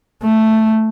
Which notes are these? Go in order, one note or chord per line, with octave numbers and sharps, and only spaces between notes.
A3